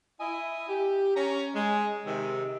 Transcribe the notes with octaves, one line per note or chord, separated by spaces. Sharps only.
E4 D#5 G#5
G4
C#4 A#5
G#3
C3 D#3